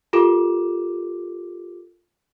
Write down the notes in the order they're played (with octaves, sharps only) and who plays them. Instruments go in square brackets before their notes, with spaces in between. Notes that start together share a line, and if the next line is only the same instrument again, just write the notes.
[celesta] F4 G4 A4 A#4 D6 E7